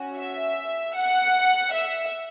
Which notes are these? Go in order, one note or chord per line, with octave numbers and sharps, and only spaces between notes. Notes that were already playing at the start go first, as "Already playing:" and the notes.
Already playing: C#4 F#4
E5
F#5
E5